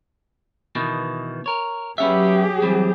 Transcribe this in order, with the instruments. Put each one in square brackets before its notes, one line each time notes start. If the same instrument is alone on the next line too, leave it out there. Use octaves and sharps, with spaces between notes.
[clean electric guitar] B2 D#3 E3
A#4 C#5
[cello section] F#3 G4 G#4 [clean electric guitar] B3 C#4 E5
[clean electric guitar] E3 G3 C4